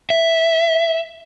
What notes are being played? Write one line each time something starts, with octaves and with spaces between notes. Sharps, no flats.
E5